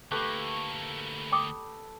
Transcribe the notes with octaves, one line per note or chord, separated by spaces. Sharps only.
D2 A3 A#3 G4 B4
G5 D6 D#6